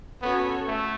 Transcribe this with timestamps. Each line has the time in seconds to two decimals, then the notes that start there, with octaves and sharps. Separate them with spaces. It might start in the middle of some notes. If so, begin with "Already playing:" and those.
0.22 B3 C#4 F#4 A4 C#5
0.67 A3